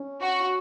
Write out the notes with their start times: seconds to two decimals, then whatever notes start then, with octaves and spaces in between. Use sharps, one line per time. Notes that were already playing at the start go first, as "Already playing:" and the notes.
Already playing: C#4
0.22 F#4